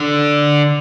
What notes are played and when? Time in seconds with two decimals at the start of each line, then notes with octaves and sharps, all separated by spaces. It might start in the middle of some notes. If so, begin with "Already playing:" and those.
Already playing: D3